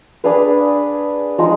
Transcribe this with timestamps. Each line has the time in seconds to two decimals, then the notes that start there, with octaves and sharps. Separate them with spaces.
0.24 D4 G#4 B4 F5
1.38 F3 G#3 D#4